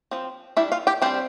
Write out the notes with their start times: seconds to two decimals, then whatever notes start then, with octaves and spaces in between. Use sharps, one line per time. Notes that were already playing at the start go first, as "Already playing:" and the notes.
0.11 F3 C4
0.57 G3 D4 E4 E5
0.72 F4 F5
0.87 G4 G5
1.02 G3 C4 D4 C5